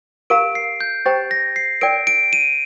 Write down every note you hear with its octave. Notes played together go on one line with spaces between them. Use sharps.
G4 A#4 F5 A#5 D7
C7
G6
G4 C5 G5 A#5 A6
A#6
C7
A#4 D5 G5 D7
D7
D#7